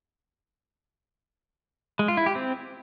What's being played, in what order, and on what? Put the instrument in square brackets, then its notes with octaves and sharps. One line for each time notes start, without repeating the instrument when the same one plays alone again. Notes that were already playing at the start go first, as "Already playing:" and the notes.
[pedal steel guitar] G#3
F4
E4
G4
C4